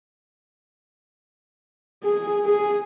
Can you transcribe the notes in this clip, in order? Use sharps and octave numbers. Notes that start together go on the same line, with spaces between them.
G#4
G#4